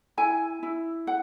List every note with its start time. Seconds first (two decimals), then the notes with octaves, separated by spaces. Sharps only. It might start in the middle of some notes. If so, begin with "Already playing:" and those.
0.17 E4 G#5
0.63 E4
1.07 F#5